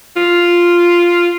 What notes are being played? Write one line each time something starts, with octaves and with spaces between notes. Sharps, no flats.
F4